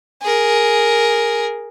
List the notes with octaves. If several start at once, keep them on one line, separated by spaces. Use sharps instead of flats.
G#4 A#4